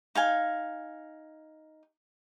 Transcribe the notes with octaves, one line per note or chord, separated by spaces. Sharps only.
D#4 F5 G#5